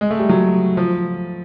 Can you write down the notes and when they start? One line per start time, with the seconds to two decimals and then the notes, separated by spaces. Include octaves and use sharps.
0.01 G#3
0.11 A3
0.19 G3
0.29 F#3
0.77 F3